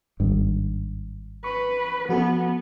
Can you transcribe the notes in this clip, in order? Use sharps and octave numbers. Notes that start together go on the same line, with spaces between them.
G#1 G2
B4 C#6
F3 B3 F#4 A4